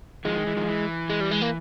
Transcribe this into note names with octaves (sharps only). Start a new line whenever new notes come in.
D#3 F3 G#3
D#3
E3
D#3 F3
E3
G#3
G3
G#3
A#3